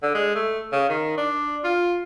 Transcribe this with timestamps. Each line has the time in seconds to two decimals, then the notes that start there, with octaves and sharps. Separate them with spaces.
0.03 D3
0.15 G#3
0.35 A3
0.72 C#3
0.89 D#3
1.18 D4
1.64 F4